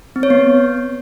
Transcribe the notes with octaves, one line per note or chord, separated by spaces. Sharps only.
C4
C#5
B3